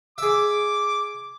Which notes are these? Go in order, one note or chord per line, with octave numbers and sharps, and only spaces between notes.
G#4 E5 D6